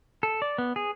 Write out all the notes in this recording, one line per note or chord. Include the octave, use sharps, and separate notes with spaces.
A4
D5
B3
G#4